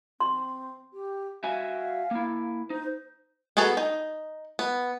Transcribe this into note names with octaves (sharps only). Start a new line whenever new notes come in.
C4 C6
G4
F#4 E5 F5 G#5
A#3 E4
D#4 C5
B3 F#4 G#4 A4 A#5
D#4
B3